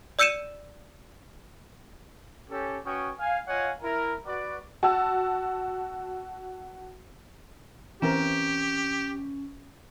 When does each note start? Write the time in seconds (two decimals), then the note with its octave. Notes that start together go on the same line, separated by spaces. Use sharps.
0.19 D5 E6 G6 C#7 D#7 E7
2.50 C#4 G4 A4
2.84 C#4 F#4 B4 G5 C#6 D#6
3.18 F5 G#5
3.47 F4 C#5 D#5 F5 F#5 G#5
3.82 E4 A#4
4.25 F#4 B4 D5
4.83 F#4 A5 E6
8.02 E3 C4 C#4 G4 A#4